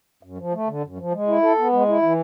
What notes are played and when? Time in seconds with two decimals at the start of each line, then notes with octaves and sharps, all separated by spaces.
0.23 F#2
0.38 F3
0.53 A3
0.68 D3
0.83 F#2
0.98 F3
1.12 G#3
1.28 E4
1.43 A4
1.58 B3
1.73 G#3
1.88 E4
2.02 E3